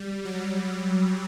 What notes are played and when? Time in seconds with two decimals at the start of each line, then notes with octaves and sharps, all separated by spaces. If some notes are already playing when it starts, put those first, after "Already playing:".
Already playing: G3
0.25 F#3